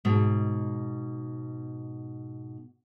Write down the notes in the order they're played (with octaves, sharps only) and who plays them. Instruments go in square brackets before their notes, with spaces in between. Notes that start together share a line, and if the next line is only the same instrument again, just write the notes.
[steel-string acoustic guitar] G#2 B2